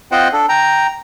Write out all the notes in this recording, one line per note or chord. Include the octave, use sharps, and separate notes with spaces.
C4 F4 C5 D#5 F#5 G5
D4 A4
G5 A#5